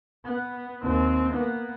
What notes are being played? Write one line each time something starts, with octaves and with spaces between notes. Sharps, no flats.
B3
D#2 C4
A#3 B3